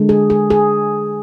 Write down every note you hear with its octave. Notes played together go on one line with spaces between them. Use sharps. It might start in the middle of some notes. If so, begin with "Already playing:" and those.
Already playing: D3 G#3
G#4
G#4
G#4